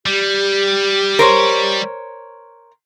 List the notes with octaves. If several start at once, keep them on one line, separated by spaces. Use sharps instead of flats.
G3 G4
A#4 C5 C#5